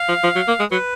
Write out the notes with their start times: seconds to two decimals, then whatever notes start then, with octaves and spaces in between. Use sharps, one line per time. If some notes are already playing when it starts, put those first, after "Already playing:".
Already playing: F5
0.08 F3
0.24 F3
0.36 F#3
0.48 A#3
0.60 G#3
0.71 F#3 B4